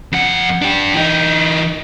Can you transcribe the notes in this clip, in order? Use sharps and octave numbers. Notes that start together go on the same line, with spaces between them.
F2 F#5
D4 G4
E3 D#4